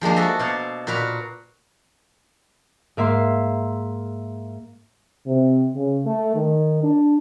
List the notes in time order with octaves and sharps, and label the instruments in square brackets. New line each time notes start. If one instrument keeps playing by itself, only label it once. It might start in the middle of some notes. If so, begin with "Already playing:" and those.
[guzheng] F3 G#3 A#3 D4
F#4 A4 D#5 E5
B2 C5 D5 F5
A#2 F#4 A#4 B4 A#5
[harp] G#2 A#3 E5 C6
[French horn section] C3
C#3
A3
D#3
D4